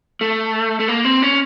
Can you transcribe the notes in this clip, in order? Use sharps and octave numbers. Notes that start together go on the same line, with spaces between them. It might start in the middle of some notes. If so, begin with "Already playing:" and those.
A3
A3
A#3
C4
C#4